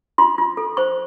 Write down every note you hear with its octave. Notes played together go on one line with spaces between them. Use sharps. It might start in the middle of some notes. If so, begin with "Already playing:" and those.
F4 C6
F4
A4
C5 C#6